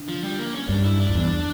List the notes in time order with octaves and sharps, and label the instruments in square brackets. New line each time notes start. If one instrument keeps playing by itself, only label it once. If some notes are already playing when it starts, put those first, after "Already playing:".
Already playing: [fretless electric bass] D3
[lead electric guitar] F3
G3
A#3
C#4
[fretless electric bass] G2 [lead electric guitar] D4
[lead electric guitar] E4
D4
[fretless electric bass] F2
E2